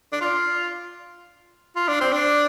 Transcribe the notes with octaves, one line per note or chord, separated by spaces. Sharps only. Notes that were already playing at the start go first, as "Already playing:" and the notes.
D4
F4
F4
D4
C4
D4